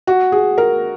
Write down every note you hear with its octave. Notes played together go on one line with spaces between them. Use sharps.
F#4
G#4
A#4